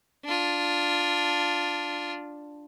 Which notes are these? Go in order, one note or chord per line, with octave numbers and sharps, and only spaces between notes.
D4 F4